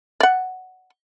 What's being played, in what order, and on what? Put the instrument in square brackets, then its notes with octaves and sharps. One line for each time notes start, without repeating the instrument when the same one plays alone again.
[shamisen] D5 F#5